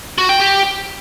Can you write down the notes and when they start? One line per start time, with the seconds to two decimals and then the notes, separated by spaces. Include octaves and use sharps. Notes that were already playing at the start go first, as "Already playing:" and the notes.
0.18 F#4
0.29 G5
0.40 G4